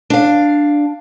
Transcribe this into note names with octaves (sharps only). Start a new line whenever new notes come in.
D4 F5